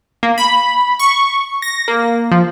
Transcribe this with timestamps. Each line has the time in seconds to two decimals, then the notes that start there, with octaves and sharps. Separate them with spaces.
0.23 A#3
0.38 B5
0.99 C#6
1.62 A#6
1.88 A#3
2.32 F3